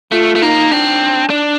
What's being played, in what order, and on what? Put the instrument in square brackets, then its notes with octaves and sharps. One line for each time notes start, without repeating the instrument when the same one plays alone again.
[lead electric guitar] A3 [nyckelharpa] F4
[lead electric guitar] A3
[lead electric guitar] A#3 [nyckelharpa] D#4
[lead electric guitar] C4 [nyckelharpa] D4
[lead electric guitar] D4